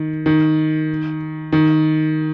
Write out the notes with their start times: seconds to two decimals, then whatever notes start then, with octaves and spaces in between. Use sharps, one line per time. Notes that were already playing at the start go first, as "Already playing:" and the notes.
Already playing: D#3
0.26 D#3
1.52 D#3